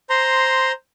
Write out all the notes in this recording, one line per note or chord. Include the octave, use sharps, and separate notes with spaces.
C5 A#5 C6